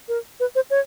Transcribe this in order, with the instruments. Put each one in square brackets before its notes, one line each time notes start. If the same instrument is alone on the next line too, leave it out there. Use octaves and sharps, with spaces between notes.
[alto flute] A#4
B4
C5
C#5